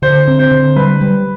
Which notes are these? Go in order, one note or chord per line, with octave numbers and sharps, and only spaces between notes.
D3 C5
C4
C5
D3
G3 B4
G3